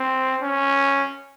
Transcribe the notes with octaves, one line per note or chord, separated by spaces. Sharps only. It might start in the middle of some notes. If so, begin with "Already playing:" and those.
Already playing: C4
C#4